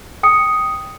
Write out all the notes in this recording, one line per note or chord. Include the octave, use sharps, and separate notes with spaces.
G5 D#6 C#7